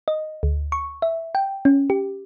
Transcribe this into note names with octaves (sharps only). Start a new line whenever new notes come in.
D#5
D2
C#6
E5
G5
C#4
G4